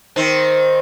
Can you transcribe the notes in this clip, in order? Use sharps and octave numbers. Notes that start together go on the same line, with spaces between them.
D#3 C4